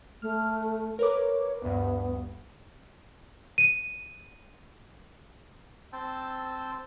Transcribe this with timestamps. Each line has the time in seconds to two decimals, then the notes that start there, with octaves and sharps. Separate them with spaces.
0.22 A3 F6
0.99 A#4 B4 C#5 D6
1.62 D2 G2 B3
3.58 D#7
5.93 C4 C5 G5 A5 E6